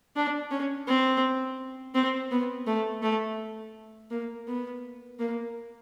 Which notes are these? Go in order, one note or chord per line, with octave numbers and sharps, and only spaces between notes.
D4
C#4
C4
C4
B3
A3
A3
A#3
B3
A#3